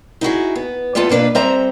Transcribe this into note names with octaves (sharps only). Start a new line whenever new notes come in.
D#4 E4 F#4 G#4
B3
G3 A3 B3 F4 A4
B2 A#3 D4 B4 F5
G3 C4 A4 C5 E5 A#5